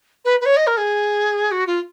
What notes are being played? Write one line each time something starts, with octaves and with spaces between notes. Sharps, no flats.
B4
B4
C#5
D#5
A#4
G#4
F#4
F4